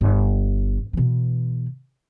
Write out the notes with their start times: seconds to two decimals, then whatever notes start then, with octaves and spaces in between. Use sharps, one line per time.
0.01 G1
0.93 B2 E3